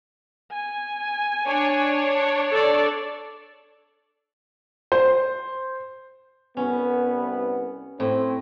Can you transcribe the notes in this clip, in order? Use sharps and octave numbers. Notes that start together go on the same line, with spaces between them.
G#5
D4 C#5
A4 D5
C5
C2 B3 C#4
A2 C4